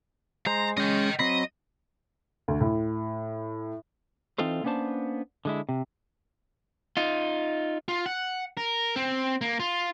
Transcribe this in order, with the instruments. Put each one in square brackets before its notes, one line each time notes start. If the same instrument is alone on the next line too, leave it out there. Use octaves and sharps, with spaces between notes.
[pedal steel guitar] G#3 C5 [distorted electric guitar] A#5
[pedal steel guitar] G#3 C#4 [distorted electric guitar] D#5 G5
[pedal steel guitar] F#3 C4 B5 [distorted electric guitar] D#5
[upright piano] D2
A2
[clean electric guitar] E3 C4 D#4 F4 A4 C5
A#3 B3 C#4 D4 C5 A5
D3 G#3 E4
C3
[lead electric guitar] D#4 F4
[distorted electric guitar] F4
F#5
A#4
C4
A#3
F4